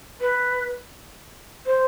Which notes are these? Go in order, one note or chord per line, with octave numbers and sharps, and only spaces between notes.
B4
C5